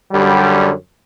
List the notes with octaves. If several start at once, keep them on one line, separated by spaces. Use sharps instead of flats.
F#2 D3 G3